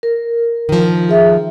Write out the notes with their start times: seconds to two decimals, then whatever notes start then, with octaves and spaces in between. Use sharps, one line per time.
0.03 A#4
0.69 D#3 F3
1.09 G#4 E5